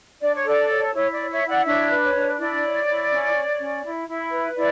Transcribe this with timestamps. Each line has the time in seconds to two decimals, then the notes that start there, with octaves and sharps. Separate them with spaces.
0.21 D4 D5
0.34 C#5
0.45 A4 D5
0.69 C#5
0.93 E4 C#5
1.12 D5
1.17 C#5
1.30 C#5 E5
1.42 E4
1.48 D5 F#5
1.65 D4 C#5 E5
1.90 B4
2.02 C#5
2.14 D4
2.38 E4 D5
2.63 C#5
2.87 E4
3.11 C#4
3.35 C#5
3.60 C#4
3.83 E4
4.07 E4
4.32 B4
4.55 E4 D5